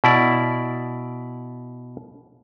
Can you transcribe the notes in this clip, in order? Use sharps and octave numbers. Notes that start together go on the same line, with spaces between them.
B2 E4 D5